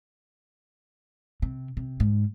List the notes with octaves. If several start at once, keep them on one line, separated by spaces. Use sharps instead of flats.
C3
C3
G#2